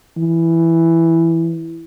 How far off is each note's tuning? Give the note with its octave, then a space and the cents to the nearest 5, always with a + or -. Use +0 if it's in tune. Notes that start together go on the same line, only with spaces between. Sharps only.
E3 +5